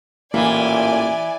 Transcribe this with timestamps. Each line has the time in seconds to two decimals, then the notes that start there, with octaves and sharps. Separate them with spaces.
0.34 A1 A#2 E3 A#3 D5 G#5